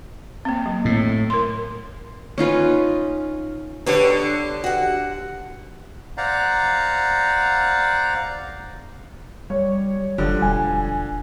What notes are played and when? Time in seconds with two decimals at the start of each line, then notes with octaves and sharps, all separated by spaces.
0.45 A#3 C4
0.66 F#3
0.85 A2
1.30 A#4 C6
2.38 C#4 D#4 F4 B4
3.86 D3 B3 G4 B4 C#5
4.64 F#4 F#5
6.18 C5 D5 F5 F#5 A#5
9.50 G3 C#5
10.18 F#1 D3 F3 G3
10.42 E1 G#5